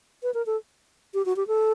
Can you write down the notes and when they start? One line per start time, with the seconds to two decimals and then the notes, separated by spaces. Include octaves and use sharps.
0.23 B4
0.34 A#4
0.46 A4
1.14 G4
1.26 F#4
1.36 G4
1.47 A4